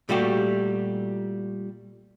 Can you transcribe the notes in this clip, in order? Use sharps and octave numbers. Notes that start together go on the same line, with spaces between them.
A#2 G3 A3 F#4 G4